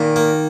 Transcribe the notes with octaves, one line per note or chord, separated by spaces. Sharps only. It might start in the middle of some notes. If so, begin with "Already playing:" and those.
Already playing: A#2 D#3
A#3